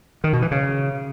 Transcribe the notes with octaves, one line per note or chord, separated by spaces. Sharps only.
D#3
B2
E3
C#3